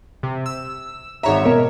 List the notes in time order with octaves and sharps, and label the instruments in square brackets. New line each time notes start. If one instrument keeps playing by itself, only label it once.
[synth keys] C3
E6
[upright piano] G#1 G#2 A#5 [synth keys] C#5 E5
[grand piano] B2 [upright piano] A#4